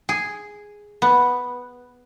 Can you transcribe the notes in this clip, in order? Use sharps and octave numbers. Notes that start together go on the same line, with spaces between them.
G#4
B3